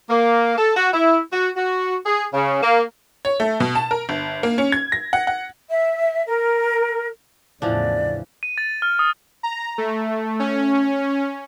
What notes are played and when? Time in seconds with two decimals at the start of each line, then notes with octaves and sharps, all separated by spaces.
0.10 A#3
0.58 A4
0.76 F#4
0.94 E4
1.33 F#4
1.57 F#4
2.06 G#4
2.34 C#3
2.63 A#3
3.25 C#5
3.40 A3
3.60 B2
3.75 A5
3.91 A#4
4.09 G1
4.43 A#3
4.58 C#4
4.72 G#6
4.92 A#6
5.13 F#5
5.27 F#5
5.68 E5
6.28 A#4
7.62 E2 A2 C#3 E3 F3 D4 D5
8.43 D#7
8.58 A6
8.82 F6
8.99 D#6
9.43 A#5
9.78 A3
10.40 C#4